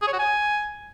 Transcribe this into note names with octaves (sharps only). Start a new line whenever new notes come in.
G#4
C#5
F#4
G#5